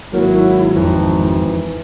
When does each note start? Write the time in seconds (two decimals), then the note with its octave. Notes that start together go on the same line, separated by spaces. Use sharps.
0.13 G#1 F#3 A#3 E4
0.76 F2 E3 D#4